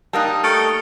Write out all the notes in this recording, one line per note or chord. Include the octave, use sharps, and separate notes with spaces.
G3 A#3 D#4 A5 D#6 F#6
A3 A4 C#6 F6 C#7 D7
D#6